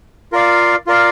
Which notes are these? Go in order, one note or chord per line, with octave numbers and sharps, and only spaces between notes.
F4 A#4 D5 F5
F4 A#4 D5 F5